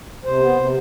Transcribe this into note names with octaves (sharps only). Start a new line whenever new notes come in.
C3 C5
B3
C3